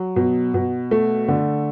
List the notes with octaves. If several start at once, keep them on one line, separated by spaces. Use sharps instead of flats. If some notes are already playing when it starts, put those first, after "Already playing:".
Already playing: F#3
B2
B2
A3
D3